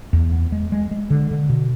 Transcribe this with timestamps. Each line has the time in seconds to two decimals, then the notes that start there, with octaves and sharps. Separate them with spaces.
0.13 E2
0.32 B3
0.52 G#3
0.72 G#3
0.91 G#3
1.10 D3
1.31 D3
1.49 B2